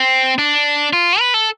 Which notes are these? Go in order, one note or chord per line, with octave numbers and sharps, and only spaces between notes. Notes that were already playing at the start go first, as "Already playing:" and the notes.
Already playing: C4
D4
F4
B4
A4